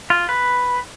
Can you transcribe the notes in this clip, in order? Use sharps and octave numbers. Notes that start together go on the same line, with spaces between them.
F4
B4